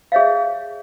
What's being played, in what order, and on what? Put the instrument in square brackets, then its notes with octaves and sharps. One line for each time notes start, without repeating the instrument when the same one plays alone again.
[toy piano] G#4 C#5 E5 F5